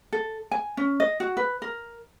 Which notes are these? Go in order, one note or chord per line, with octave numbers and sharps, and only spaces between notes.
A4
G#5
C#4
D#5
F#4
B4
A#4